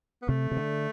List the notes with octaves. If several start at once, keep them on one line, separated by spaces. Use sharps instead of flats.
B3
C3 A3
C3
D3